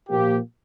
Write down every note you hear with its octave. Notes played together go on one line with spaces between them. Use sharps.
A#2 F3 A#3 G4